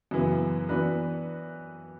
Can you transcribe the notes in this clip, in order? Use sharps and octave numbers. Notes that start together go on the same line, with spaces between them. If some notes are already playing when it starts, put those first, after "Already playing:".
F#2 C#3 E3 B3
E3 B3 D4 F#4 B4